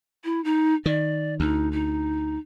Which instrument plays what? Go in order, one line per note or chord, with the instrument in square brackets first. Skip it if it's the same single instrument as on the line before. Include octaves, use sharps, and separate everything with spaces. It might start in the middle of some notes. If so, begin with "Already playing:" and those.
[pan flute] E4
D#4
[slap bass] D#3 [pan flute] D5
[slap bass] D2 [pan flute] D#4
[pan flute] D#4